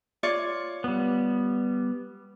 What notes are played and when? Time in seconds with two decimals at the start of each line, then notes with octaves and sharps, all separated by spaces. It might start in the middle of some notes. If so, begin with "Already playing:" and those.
0.23 F4 C#5 D5
0.84 G3 B3